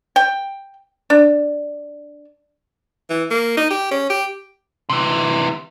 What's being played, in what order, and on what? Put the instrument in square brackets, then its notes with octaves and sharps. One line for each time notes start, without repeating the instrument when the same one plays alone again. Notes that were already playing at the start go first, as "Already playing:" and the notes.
[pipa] G5
D4
[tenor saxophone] E3
A#3
D#4
G4
C#4
G4
[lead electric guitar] C3 E3